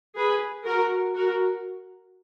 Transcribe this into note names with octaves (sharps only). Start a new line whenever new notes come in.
G#4 B4
F#4 A#4
F#4 A#4